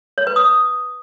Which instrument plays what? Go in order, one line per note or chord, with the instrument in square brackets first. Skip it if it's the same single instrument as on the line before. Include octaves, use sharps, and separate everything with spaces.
[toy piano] C#5
B4
D#6